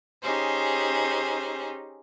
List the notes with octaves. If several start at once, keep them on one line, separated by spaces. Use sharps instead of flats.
C#4 D#4 G4 G#4 C5